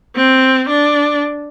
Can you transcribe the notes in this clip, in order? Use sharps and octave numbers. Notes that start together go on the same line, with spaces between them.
C4
D4